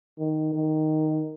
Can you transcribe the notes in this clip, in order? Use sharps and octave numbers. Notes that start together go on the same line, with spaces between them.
D#3
D#3